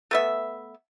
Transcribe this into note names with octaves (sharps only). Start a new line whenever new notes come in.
A3 B3 E5